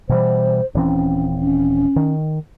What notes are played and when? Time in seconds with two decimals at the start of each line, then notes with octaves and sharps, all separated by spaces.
0.09 B2 E3 G3 C5
0.75 D#1 E3 C4 C#4
1.41 C#4
1.96 D#3